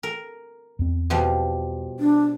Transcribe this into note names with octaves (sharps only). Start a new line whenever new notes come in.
A#4
E2 C4
B2 F3 G3
D4